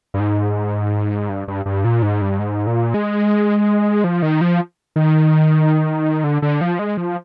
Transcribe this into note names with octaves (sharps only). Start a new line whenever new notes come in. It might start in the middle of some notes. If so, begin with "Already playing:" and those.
G2
G#2
G2
G2
G2
A#2
G#2
G2
G#2
A#2
G#3
F3
D#3
F3
D#3
D3
D3
F3
G#3
F3